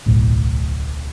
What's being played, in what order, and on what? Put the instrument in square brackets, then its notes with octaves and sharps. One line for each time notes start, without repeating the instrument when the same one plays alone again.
[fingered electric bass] D1 B1 A2